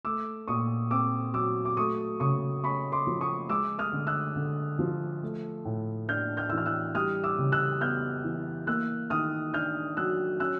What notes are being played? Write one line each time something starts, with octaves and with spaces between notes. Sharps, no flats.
A3 D6 E6
A#2 C#6 D#6
C4 D6 E6
F#3 D6 E6
D6
A3 C#6 D#6
C#3 C#6 D#6
C#4 B5 C#6
C6 D6
F3
C#6 D#6
G#3 D6 E6
D#6 F6
D3
E6 F#6
D3
F3
A3
A2
D4 F6 G6
F6 G6
E3 E6
F6
E6 F#6
G3 D#6 F6
D6 E6
C#3
E6 F#6
B3 F6 G6
E3
A#3 E6 F#6
D#3 D#6 F6
D4 F6 G6
F#3 E6 F#6
C#4 E6 F#6